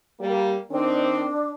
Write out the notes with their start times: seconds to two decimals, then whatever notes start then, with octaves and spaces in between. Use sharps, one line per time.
0.20 G3 A#3
0.70 D#3 C4 D4